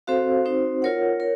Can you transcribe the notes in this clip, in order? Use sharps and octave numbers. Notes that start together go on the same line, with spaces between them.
C4 F#4 A4 C5 F5
C4 D#4 F#4 C5
F4 A#4 C#5 F#5
A#4 C#5